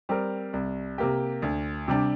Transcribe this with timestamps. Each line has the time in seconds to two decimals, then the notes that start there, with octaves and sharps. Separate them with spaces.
0.09 G3 C4 A#4
0.53 C2
0.98 C3 A#3 G4
1.42 D2
1.88 C3 G3 D4